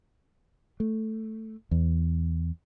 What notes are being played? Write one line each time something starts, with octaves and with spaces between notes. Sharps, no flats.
A3
E2